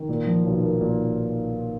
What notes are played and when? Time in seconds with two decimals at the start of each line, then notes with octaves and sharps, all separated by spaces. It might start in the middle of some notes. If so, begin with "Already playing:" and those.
Already playing: D#3
0.09 A#2
0.27 F3
0.44 B1
0.63 A#3
0.81 A#2